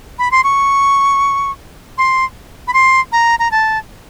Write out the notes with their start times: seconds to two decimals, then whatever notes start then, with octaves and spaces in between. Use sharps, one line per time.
0.19 B5
0.31 C6
0.44 C#6
1.98 C6
2.68 B5
2.74 C6
3.12 A#5
3.39 A#5
3.51 A5